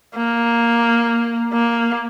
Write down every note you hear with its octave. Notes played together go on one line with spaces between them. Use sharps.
A#3
A#3